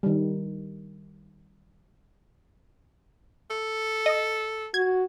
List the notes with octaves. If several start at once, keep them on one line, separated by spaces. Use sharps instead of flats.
D#3 G3
A4
D#5
F#4 G#6